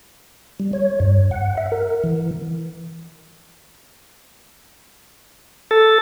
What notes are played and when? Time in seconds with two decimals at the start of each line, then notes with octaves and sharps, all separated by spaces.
0.60 G3
0.73 C#5
1.00 G2
1.31 F#5
1.58 E5
1.72 A#4
2.04 E3
5.71 A4